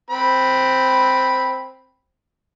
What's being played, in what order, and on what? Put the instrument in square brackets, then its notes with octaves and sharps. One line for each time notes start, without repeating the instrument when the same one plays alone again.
[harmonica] C4 B5